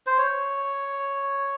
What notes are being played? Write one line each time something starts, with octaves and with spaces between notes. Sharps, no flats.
C5
C#5